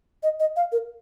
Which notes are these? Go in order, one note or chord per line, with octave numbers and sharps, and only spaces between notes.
D#5
D#5
F5
A#4